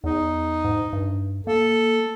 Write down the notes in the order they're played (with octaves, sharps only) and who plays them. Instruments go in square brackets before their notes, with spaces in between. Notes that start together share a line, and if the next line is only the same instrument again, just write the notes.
[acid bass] E2 [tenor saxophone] D#4
[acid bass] G#2
G2
[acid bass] A#3 [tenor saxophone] A4